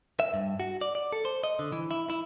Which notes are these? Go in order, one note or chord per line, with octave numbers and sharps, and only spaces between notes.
E5
G2
F#4
D5
D5
A4
C5
D#5
D3
E3
E4
E4